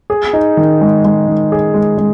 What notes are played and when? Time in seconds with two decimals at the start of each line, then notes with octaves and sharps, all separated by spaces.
0.10 G#4
0.33 D#4
0.57 D#3
0.81 G#3
1.05 G#3
1.28 D#3
1.52 G#4
1.74 G#3
1.98 G#3